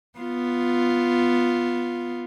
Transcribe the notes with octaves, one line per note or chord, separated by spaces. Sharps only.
B3 F4